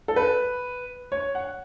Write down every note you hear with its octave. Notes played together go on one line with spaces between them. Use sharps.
A4
B4
C#5
F#5